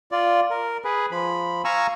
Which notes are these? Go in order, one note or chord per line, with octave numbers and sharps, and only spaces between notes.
F4 D5
A#4
G#4 B4
F3 B5
F5 G#5 A#5 C#6 E6